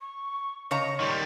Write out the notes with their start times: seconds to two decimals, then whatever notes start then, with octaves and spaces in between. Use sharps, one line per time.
0.01 C#6
0.71 C#3 C#5 D#5 A#5
1.00 D#3 G3 C6